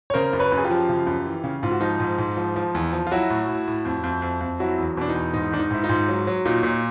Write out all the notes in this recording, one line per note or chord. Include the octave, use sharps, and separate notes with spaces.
C#5
C#3 A#4 C5
F#2
B4 C#5
F#2
G#4
F4 G4
F3
C#3
F#2
E3
C#3
G#2 F4
F#4
F3 D#4 F4
G#2
G#2
F3
F3
E2
F3
F4
F#3 E4 F#4
A2
A2
A2
F2
F2
F2
F2
F#3 E4 F#4
E2
B2 D4
D#4
E2
G#2 D#4
D#3 D4
D#4
G#2 E4
D#4 F4
G#2
F#3
F#3
A#2 D#4 F4
A#2